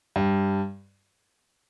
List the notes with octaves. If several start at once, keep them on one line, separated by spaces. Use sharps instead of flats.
G2